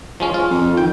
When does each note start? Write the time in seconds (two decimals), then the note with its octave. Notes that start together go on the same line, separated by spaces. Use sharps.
0.20 F3 G#3 C#4
0.34 F4
0.51 F2
0.77 D#3 G5